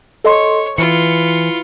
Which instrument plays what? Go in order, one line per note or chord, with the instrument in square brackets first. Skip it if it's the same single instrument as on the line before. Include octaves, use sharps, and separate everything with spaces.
[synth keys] A4 D#5 C6 [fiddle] C#5
[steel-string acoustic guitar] E3 [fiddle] F4 B5 [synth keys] C#7